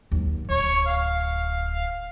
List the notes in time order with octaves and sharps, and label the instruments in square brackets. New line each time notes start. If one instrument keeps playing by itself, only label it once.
[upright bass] D#2 F#3
[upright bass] D1 G1 [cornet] C#5
[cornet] F5